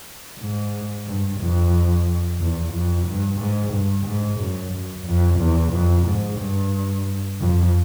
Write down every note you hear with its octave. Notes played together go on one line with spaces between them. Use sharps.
G#2
G2
F2
E2
F2
G2
G#2
G2
G#2
F#2
F#2
F2
E2
F2
G#2
G2
F2